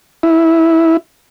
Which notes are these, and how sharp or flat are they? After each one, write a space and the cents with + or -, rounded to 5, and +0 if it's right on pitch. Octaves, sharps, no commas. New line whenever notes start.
E4 -10